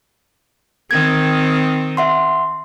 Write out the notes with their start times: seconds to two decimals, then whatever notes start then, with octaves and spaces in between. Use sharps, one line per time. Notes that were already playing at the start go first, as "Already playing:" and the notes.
0.91 D#3 C4 G#6
1.97 E5 F#5 C6